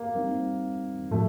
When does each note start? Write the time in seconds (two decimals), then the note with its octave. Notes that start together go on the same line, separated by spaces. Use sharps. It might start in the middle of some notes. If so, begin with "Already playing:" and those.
Already playing: A#3
0.15 G3 C4 D#4
1.11 A2 F3 A3